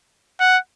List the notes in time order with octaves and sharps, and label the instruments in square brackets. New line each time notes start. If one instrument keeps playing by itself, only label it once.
[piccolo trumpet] F#5